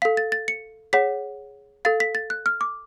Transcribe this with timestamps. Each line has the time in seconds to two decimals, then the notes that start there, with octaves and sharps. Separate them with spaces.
0.02 A4 F5 B6
0.17 A6
0.32 A6
0.48 C#7
0.93 G#4 C#5 F#5 B6
1.85 A4 F5 A6
2.00 B6
2.15 A6
2.30 F#6
2.46 F6
2.61 D6